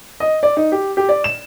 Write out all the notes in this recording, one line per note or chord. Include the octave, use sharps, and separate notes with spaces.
D#5
D5
D#4
G4
G4
D5
E7